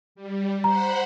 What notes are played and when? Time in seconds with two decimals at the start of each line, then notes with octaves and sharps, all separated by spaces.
0.15 G3
0.64 C5 F#5 A#5 B5